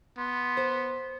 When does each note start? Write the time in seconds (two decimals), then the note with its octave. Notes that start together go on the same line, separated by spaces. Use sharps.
0.18 B3 C6
0.57 C5